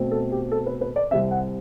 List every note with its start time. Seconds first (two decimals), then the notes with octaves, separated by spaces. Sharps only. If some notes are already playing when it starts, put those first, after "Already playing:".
Already playing: B2 A3 C4
0.11 A4
0.32 G4
0.51 A4
0.66 B4
0.81 B4
0.96 D5
1.11 C2 C3 G3 C4 E5
1.31 F#5